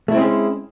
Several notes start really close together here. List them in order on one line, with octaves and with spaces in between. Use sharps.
A3 E4 C4 G#3 C#4